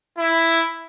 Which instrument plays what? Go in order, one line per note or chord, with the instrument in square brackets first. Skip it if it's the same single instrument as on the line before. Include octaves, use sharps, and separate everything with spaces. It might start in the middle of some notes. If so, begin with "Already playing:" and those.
[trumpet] E4